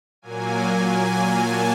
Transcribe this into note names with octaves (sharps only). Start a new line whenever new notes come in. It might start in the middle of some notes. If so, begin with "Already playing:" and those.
A#2 F#3 A#3 G#5
G#5
A5